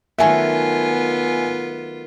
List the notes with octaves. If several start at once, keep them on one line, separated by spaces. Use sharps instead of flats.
D#3 F#3 A3 B3 F4 E5 G#5